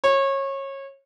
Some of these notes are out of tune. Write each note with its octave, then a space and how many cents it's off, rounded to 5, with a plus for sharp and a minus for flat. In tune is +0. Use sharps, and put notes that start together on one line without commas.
C#5 -25